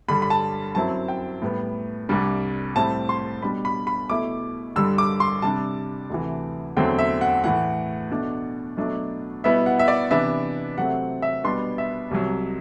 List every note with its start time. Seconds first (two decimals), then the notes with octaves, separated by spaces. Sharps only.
0.08 G2 D3 G3 B5
0.22 B5
0.30 A5
0.75 F#2 F#3 C4 E4 A5
1.08 G5
1.42 A2 G3 B3
2.09 C2 C3 G3 D4
2.76 A2 G3 C4 E4 A5
3.09 C6
3.42 B2 G3 D4 B5
3.65 B5
3.87 B5
4.09 B2 A3 E4 D6
4.76 G2 D3 G3 E6
4.98 D6
5.20 C6
5.42 C3 G3 D4 A5
6.10 D2 C3 E3
6.77 E2 D3 F#3 A3 C4 G5
6.99 E5
7.21 F#5
7.44 A2 E3 A3 F#5
8.10 B2 A3 D4
8.77 B2 F#3 A3 D4
9.44 B2 G3 B3 E4 E5
9.66 F#5
9.79 E5
9.88 D5
10.11 C3 E3 B3 D4 E5
10.78 C3 F#3 A3 C4 F#5
11.22 E5
11.44 B2 G3 B3 D4 C6
11.78 E5
12.11 C2 C3 F#3